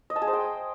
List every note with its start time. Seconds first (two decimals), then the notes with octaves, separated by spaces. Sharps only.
0.10 D#5
0.16 A5
0.22 G#4
0.27 C5
0.33 G5